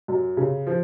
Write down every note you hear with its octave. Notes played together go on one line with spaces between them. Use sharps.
F#2
C#3
F3